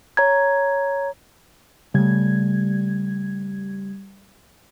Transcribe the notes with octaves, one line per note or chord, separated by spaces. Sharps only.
C#5 A#5 G#6
C#3 G3 A3 G#6